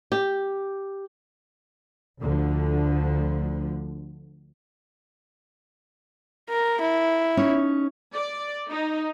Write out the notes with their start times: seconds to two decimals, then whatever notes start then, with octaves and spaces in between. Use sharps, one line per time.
0.12 G4
2.19 D2 D3 F3
6.49 A#4
6.81 E4
7.37 C#4 D#4 C#5
8.14 D5
8.69 D#4